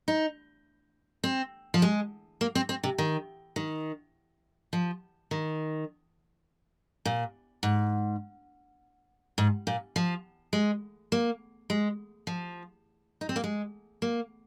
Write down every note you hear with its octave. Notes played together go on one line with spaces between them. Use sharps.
D#4
C4
F3
G#3
A#3
C4
C4
C3
D#3
D#3
F3
D#3
A#2
G#2
G#2
A#2
F3
G#3
A#3
G#3
F3
D#4
C4
A#3
G#3
A#3